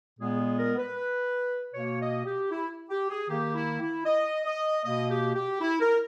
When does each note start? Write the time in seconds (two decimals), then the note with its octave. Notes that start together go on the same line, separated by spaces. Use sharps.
0.19 A#2 G#3 B3 G#4
0.38 G#4
0.58 A#4
0.77 B4
1.74 B2 A#3 C#5
2.00 D#5
2.25 G4
2.51 E4
2.90 G4
3.10 G#4
3.29 D#3 A#3 G4
3.54 E4
3.81 E4
4.06 D#5
4.45 D#5
4.84 B2 A#3 D#5
5.09 G4
5.35 G4
5.61 E4
5.80 A#4